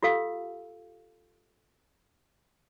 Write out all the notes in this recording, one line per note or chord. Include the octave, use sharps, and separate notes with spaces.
F4 G4 A4 F5 E6